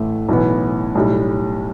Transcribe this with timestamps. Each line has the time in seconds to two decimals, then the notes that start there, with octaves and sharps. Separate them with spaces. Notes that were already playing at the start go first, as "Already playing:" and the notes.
Already playing: A1 A2 E3 A3
0.29 B1 A2 E3 B3
0.95 B1 A2 G3